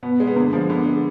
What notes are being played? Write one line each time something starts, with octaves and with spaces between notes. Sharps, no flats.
B2 B3
G#3
B3
D3 A#3
F3 G#3
D3 B3
G#3